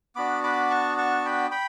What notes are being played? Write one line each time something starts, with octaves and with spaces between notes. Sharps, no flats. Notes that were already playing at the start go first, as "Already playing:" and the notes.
B3 D4 F#4 B5 D6
B5 D6
A5 C#6
A5 C#6
G5 B5
G5 B5